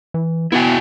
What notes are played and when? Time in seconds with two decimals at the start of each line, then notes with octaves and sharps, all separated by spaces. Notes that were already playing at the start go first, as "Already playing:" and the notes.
0.14 E3
0.52 B3 E4 F#4 G#5